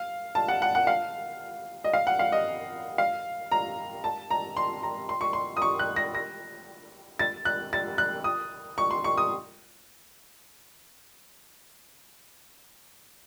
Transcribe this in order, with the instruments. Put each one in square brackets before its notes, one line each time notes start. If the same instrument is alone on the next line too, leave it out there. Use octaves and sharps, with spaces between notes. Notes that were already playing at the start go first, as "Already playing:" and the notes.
Already playing: [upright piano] F5
A5
F#5
F#5
F#5
F5
D#5
F5
F#5
F5
D#5
F5
A#5
A5
A#5
C6
A#5
C6
C#6
C6
D#6
C#6
F#6
A#6
A#6
A6
F#6
A6
F#6
D#6
C#6
C6
C#6
D#6